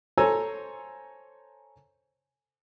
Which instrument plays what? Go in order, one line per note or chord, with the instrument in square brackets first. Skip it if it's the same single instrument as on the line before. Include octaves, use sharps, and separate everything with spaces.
[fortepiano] A4 C5 C#5 G#5 A#5 E6